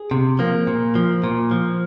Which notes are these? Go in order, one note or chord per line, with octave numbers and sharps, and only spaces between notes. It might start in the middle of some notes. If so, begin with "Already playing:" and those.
Already playing: G#4
C3
F3 A#3
A#2
F3
A#2
F3